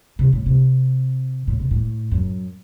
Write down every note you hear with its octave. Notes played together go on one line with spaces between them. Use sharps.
C3
A2
C3
A2
C3
A2
F#2